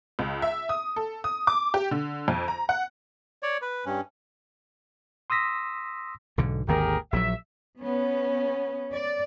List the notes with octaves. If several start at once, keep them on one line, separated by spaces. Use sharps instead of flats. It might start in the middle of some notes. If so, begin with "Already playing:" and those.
C#2
E5
D#6
A4
D#6
D6
G4
D3
F2
A#5
F#5
C#5 D5
B4
G2 C#4
C6 D#6 E6 A#6 B6
B1 G#2 D3
G#1 D#2 D3 G4 G#4 A#4
A#1 F3 F#3 E5
B3 C#4
D5